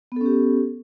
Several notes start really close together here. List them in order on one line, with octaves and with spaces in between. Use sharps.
B3 A4 C#4 G4